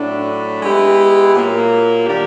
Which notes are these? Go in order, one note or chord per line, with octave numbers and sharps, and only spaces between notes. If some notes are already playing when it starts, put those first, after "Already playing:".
Already playing: A2 F#3 A3 D4
G#3 B3 E4 G4
A#2 F#3 A#3
D#3 G3 A#3 D4 G4